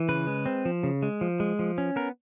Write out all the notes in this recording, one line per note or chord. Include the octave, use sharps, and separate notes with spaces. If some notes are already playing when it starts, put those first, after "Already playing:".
Already playing: E3
C#3 B4
G#3
C4
F3
C#3
G#3
F3
G#3
F3
C#4
B3 A#4